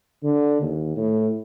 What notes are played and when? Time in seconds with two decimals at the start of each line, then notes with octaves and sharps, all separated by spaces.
0.23 D3
0.62 D#2
0.96 A2